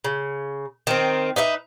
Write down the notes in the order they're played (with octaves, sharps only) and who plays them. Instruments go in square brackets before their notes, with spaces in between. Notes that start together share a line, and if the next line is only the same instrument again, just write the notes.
[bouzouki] C#3
D#3 C4
D#4 B4 D#5 E5